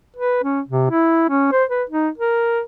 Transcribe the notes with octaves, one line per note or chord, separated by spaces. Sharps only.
B4
C#4
C3
E4
C#4
C5
B4
D#4
A#4